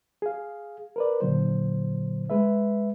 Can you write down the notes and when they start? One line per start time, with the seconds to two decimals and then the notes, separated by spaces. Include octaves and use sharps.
0.22 G#4 F5
0.96 A#4 B4 D5
1.20 A#2 D3 F#3 C5
2.30 G#3 B4 E5